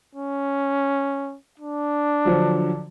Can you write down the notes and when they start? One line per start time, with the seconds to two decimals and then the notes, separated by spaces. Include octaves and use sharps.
0.15 C#4
1.59 D4
2.25 D3 F3 F#3